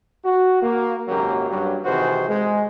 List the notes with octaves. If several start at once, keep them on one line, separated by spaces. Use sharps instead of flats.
F#4
A#3
G#1 C#2 F#2 F#3 A#3 G4
G2 F#3
C3 D#3 E3 F#4 G#4 C5
G#3